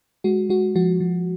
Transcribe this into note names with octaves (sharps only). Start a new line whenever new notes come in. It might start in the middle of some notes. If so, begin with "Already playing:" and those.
G#3 F#4
G#3 F#4
F3 F#4
F3